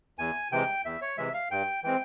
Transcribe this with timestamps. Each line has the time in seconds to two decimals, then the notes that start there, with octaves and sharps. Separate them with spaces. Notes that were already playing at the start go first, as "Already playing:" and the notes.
0.18 E2 G#5
0.52 C3 E3 G#3 G5
0.85 E2 E5
1.02 C#5
1.18 C3 E3 G#3 E5
1.34 F5
1.51 G2 G5
1.83 E3 G#3 C4 G5